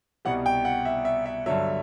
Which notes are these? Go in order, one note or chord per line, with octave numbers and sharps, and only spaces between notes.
C2 B2 G3 F#5
G5
F#5
E5
E5
E5
G2 D3 F#3 E5